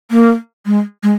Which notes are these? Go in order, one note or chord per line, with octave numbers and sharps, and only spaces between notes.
A#3
G#3
G#3